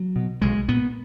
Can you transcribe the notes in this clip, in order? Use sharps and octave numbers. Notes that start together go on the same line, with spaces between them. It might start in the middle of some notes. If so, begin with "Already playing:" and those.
Already playing: F#3
B2
B1 G#3
A#2 B3